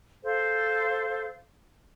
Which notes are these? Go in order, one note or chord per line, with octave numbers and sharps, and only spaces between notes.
A4 C5 F5